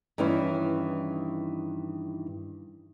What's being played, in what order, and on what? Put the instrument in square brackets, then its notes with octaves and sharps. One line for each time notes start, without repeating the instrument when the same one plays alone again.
[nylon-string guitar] G2 D#3 E3 C#4 E4